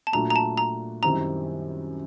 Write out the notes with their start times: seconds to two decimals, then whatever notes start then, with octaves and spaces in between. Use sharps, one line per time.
0.07 A5
0.12 A#2 F#3 A3 D4 F#4 A#5
0.30 A#5
0.36 A5
0.57 A#5
1.03 F#2 D#3 G3 C4 E4 A#5